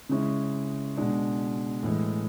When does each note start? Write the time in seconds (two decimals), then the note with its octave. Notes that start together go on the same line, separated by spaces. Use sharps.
0.09 C#3 G#3 C#4 E4
0.97 B2 G#3 D4
1.83 A2 E3 G#3